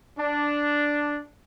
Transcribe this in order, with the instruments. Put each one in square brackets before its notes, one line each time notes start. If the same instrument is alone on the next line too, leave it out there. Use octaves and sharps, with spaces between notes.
[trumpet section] D4